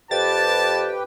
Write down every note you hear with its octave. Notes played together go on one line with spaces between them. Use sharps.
F2 G4 B4 G5 A5 A6